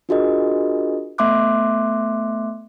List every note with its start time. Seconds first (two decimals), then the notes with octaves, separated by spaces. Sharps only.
0.09 D4 F4 F#4 G#4 A#4 D#5
1.18 A3 B3 E5 C6 D6 F#6